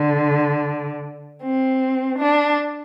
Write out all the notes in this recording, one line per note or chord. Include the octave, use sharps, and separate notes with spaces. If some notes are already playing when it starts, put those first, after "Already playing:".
Already playing: D3
C4
D4